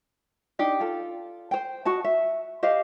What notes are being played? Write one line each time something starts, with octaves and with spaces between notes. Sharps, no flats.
D4 D#4 G4
F4 A4
C5 G5
F#4 D#5 A5
E5
G4 C5 D#5 F5